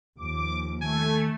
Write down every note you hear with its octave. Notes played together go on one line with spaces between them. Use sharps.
D#2 F3 D6
D#3 A3 G#5